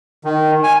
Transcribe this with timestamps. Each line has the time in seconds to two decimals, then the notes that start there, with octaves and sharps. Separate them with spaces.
0.24 D#3
0.64 G#5